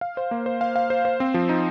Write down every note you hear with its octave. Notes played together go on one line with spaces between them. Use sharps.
F5
C5
A#3
C5
F5
F5
C5
C5
C4
F3
D#4